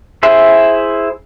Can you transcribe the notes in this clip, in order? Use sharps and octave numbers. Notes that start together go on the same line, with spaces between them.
E4 G#4 C5 E5